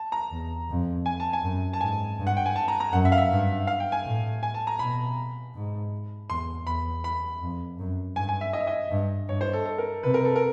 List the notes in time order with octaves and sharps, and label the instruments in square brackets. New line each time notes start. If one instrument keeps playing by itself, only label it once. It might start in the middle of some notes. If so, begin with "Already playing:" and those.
Already playing: [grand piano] A5
A#5
[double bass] E2
F2
[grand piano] G#5
A5
G#5
[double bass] F#2
[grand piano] A5
[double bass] G#2 [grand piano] G#5
[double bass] G2
[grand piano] F#5
G5
G#5
A5
A#5
A#5
[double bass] F#2 [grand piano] F#5
[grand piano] E5
F5
E5
[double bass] G2
[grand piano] F5
G5
G#5
[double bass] A2
[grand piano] G#5
A5
A#5
[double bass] B2 [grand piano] B5
[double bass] G#2
[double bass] E2 [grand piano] C6
[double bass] E2 [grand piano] B5
[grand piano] B5
[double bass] F2
F#2
[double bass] G2 [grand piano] G#5
[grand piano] G#5
E5
D#5
E5
D#5
[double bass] G2
[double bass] G2 [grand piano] C#5
[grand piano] C5
A4
A4
A#4
[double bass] C3 [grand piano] B4
[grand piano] A#4
A4
A#4